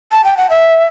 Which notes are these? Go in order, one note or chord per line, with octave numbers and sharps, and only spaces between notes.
A5
G5
F#5
E5